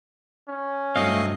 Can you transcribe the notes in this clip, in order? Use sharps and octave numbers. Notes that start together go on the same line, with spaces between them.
C#4
G2 F#3 A3 C4 D#5 F5